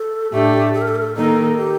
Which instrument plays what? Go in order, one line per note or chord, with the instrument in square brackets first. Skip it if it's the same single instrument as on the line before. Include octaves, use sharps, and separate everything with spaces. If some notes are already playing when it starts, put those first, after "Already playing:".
Already playing: [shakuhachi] A4
[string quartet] A2 A3 D4 [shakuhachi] G4
[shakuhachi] A4
A#4
A4
A#4
A4
[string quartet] D#3 A#3 D#4 A#4 [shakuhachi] A4
[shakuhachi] G4